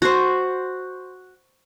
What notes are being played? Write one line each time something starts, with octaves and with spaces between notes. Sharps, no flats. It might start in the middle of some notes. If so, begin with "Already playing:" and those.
F#4 C5